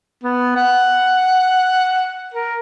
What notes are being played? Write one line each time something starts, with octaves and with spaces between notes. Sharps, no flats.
B3
F#5
A#4